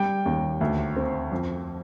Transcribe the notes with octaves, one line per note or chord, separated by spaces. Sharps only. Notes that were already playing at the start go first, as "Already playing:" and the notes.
Already playing: G3 G5
D#2
D2
C4
F2